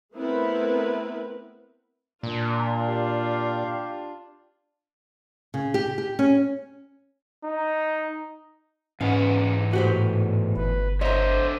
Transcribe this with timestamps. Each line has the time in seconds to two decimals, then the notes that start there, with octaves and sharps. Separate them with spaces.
0.14 A3 B3 C4 E4 A#4 B4
2.23 A#2 D4 F4
2.87 G4 F5
5.54 C#3
5.74 G4
5.98 G4
6.19 C#4
7.44 D#4
9.01 E2 G#2 B3 C#4 D#4 F5 F#5
9.73 A2 F#4 G4 C5
10.56 G1 B4
11.01 D3 C5 C#5 D#5 E5 A#5